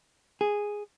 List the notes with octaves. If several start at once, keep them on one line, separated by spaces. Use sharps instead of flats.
G#4